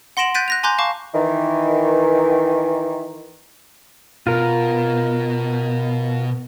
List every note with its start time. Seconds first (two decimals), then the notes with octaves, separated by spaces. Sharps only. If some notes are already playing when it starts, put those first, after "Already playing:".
0.17 F#5 C6 A#6 D7 E7 F#7
0.35 F#6 G6 A6 B6 D7 D#7
0.48 F#6 A#6 F7
0.63 G#5 A#5 C6 D6 F#6 G6
0.78 F5 A5 C#6 D6
1.14 D#3 E3
4.27 B2 F4 A#4